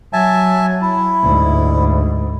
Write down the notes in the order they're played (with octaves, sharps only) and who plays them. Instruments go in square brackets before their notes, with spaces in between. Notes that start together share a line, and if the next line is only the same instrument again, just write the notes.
[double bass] F#3 [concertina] E5 G#5 A5
[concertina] E4
[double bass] D2 G#2